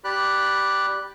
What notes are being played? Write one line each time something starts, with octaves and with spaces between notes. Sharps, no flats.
G4 D5 B5 F#6